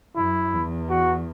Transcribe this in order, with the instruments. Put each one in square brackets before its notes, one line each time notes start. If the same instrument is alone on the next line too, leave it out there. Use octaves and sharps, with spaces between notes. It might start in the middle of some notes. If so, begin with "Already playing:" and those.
[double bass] F#2 [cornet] E4
[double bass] E2
[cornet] F#4